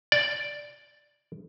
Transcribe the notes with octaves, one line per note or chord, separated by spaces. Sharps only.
D5